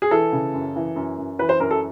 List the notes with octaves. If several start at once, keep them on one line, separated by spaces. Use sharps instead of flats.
G#4
E3 A4
C#3
F#2
E3
F#2
F#2
E3 B4
C5
F#2 A#4
A4